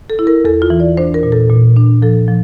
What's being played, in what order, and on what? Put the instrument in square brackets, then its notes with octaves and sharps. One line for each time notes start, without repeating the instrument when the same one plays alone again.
[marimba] A4
E4
A#4
E2 A4
F4
E3
D5
D4 C5
A#4
A#2
A4
A#2
D4
F3 A4
F3